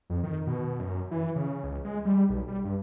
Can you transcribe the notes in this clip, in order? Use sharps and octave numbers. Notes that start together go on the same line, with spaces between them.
F2
D#3
B2
F#2
E3
C#3
C#2
G#3
G3
B1
G3
G2